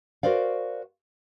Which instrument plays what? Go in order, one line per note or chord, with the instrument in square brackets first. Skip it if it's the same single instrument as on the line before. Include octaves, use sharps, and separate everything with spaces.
[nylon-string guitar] F#4 A#4 C5 D5 F5